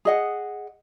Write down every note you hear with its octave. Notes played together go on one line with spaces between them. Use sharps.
G#4 D#5 F#5